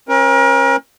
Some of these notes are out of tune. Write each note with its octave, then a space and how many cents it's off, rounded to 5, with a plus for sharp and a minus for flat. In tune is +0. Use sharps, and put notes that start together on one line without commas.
C#4 -40 A#4 +35